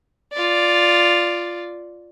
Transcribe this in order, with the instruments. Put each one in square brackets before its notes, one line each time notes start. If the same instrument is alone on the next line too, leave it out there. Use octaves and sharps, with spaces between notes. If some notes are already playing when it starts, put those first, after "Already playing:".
[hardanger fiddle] F4 D5